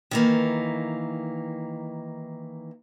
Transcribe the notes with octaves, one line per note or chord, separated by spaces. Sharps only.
D#3 E3 A#3